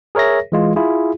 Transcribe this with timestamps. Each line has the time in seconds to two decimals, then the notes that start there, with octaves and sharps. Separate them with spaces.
0.15 G#4 A#4 C#5 E5 A#6
0.52 E3 G#3 F4
0.76 E4 F4 G#4